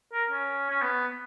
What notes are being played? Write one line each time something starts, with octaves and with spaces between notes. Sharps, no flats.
A#4
C#4
C#4
B3